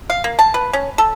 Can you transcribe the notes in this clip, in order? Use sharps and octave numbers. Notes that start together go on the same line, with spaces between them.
F5
A#3
A5
B4
C#4
A4